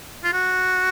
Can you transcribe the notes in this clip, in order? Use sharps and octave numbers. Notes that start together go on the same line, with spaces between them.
F4
F#4